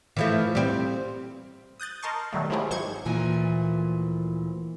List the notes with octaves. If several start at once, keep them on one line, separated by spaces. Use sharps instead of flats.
E3 F3 A3
G3 C4
D#6 F#6 G6 A6
A#4 D#5 A5 C6 C#6
B2 D#3 F#3 G3 A3
F3 F#3 G#3 E4 G4 G#4
G#1 G#2 C5 C#6 G#6
D2 A#2 E3 F3 A#3 G#5